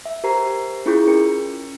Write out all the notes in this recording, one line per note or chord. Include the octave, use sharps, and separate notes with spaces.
E5
G4 A#4 C5 A#5 C7
C#4 E4 F4 G#4 C#6 G6
C#4 A#4 C#7